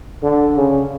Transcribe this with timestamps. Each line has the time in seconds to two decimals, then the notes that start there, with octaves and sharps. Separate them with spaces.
0.23 D3
0.57 C#3